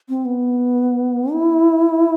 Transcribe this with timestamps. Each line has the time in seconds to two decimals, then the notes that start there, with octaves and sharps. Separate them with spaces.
0.09 C4
0.25 B3
1.33 E4